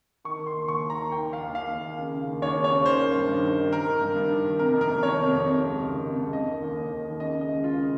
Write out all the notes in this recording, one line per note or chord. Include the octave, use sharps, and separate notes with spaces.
D#3 C#6
D#3
C6
D#2
D#2 C#6
D#3
A#5
D#3
D#3 G5
D#3
F5
D#2
D#2 F5
D#3
D#3
C#3
C#3
D#2
D#2 C#5
C#3
C#5
C#3
D#3 C5
D#3
G2
G2
D#3
D#3
D#3 A#4
D#3
G2
G2
D#3
D#3
C3 A#4
F2
A#4
F2
D#3 C#5
C3
F2
C3
C#2
C#2
D#3
C3
C#2
D#3 D#5
D#3
D#2
D#2
D#3
D#3
C#3 D#5
C#3
D#5
C#2
C#2 F4
C#3